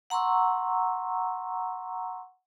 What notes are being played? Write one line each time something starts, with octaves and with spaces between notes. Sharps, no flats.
F#5 A#5 C6 C#6 E6